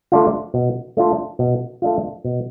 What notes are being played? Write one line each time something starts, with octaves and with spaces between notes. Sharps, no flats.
A3 D4 F4
B2
A3 D4 F4
B2
A3 D4 F4
B2